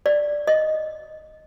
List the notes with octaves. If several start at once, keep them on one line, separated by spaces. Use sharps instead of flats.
D5
D#5